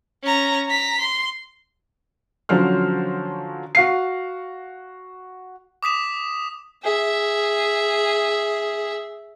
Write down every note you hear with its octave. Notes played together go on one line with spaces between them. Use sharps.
C#4 A#5
A#5 B6
C6
D3 F3 F#3 C#4 C5 F6
F#4 F5 C7
D6 D#6 B6 E7
G#4 E5